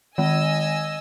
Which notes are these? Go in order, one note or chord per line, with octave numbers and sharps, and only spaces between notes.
D#3 G#3 D#5 G#5 E6